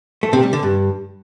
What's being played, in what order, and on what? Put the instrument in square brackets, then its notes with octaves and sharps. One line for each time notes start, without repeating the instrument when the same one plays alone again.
[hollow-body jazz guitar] A3
C3
G3
D3
G2